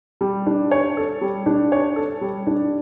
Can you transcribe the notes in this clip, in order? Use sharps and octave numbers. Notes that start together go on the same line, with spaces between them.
G3
D4
C#5
A4
G3
D4
C#5
A4
G3
D4